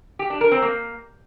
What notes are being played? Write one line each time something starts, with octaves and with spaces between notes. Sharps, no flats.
G4
D4
A#4
C4
A#3